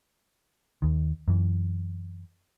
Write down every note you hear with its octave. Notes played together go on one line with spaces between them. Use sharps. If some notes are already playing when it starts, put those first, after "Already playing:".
D#2 D#3
F#2 E3